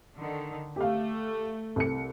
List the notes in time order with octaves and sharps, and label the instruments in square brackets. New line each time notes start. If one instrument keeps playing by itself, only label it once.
[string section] D3 D#3
[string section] A3 [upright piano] G4 F5
[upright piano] C2 A4 C#7